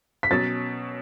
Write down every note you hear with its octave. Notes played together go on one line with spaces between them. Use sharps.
B6
B2 F#3 C#4 A6